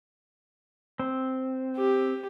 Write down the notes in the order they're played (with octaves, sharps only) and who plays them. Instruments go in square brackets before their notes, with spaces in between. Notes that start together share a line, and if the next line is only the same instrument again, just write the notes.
[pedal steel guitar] C4
[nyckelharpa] G4